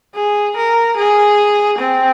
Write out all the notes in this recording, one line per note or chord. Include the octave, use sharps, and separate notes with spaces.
G#4
A#4
G#4
C4